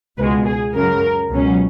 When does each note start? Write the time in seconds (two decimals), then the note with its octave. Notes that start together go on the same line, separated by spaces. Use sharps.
0.18 C#2 B2 G#3 B4
0.46 G#4
0.74 F#2 C#3 F#3 A#4
1.30 C#2 B2 F#3 C#4